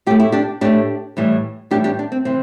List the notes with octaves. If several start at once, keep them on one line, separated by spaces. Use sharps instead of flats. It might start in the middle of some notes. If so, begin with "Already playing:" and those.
A2 A3 G4
E4
D4 G4
A2 A3 D4 G4
A2 E3 G3
A2 E3 G3 D4 G4
D4 G4
D4
C4
C3 E3 C4